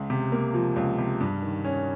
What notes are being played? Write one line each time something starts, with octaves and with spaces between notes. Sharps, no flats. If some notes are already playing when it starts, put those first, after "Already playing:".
Already playing: C#2
C3
A#3
F3
C#2
C3
G2
D#3
C#4